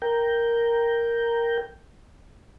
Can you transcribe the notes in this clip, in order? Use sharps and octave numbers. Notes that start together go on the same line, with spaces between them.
A#4 G5